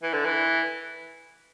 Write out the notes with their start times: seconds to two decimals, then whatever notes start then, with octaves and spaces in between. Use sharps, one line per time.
0.03 E3
0.14 D3
0.25 E3